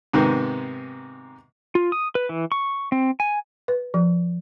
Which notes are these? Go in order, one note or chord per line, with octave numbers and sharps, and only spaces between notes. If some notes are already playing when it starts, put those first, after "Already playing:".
G#2 C3 D#3 B3
F4
D#6
B4
E3
C#6
C4
G#5
B4
F3